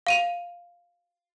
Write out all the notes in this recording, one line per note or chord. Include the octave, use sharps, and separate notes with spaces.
F5 D#7 F7